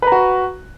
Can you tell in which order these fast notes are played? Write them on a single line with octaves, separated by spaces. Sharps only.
B4 A#5 F#4